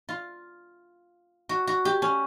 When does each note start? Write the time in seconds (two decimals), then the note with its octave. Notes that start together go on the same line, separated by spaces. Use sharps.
0.09 F4
1.49 F#4
1.67 F#4
1.85 G4
2.02 C#4